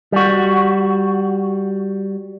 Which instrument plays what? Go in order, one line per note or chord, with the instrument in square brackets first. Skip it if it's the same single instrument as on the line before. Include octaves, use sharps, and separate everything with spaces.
[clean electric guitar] G3 F#4